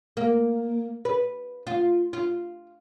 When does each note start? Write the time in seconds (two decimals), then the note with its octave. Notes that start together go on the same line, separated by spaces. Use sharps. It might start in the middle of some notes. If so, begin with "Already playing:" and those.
0.17 A#3
1.05 B4
1.67 F4
2.13 F4